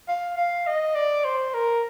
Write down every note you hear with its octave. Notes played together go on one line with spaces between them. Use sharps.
F5
F5
D#5
D5
C5
A#4